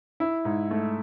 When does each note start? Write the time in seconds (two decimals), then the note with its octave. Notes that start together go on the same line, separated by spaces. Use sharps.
0.20 E4
0.45 G#2
0.71 A3